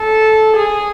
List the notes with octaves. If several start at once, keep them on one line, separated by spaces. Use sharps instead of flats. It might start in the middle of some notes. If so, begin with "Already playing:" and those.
Already playing: A4
G#4